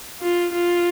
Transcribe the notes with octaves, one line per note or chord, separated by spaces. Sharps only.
F4
F4